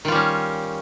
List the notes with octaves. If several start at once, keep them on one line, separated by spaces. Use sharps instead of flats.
D#3 G3 C#4 F4